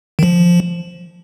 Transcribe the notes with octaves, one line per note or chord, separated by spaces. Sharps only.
D#3
F3